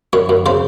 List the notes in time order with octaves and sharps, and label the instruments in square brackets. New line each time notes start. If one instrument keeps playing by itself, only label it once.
[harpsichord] F#2 C#5
F#2
C#3 C5